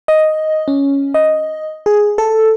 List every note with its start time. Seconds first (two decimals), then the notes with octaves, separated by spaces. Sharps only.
0.08 D#5
0.68 C#4
1.14 D#5
1.86 G#4
2.18 A4